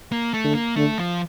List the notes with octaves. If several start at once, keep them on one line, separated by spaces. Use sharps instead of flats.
A#3
A3
D3
A#3
D3 A3
F3